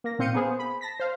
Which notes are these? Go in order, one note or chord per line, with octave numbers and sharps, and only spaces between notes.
A#3 A#6
A#2 C4 F5 G6 C#7 D#7
A#3 B3 G#4 C5
B5
A5 A#6 B6
C5 F5